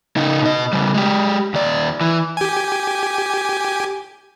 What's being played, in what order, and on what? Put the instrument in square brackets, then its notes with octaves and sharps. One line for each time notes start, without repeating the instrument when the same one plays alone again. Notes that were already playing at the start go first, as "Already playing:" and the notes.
[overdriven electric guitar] C#3 D#4
B2 D#5
C#3 G3
G#3 G4
D#2 D5
E3
[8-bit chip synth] G4 G#5